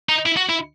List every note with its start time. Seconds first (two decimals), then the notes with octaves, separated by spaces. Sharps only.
0.09 D#4
0.26 E4
0.37 F#4
0.49 E4